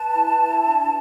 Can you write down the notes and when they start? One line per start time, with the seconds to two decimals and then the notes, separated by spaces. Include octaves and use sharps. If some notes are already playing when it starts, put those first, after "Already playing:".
Already playing: B4 A5
0.14 E4
0.41 E4
0.67 D4